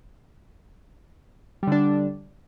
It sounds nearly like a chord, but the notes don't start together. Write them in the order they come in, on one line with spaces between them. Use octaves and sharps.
G3 D3 D4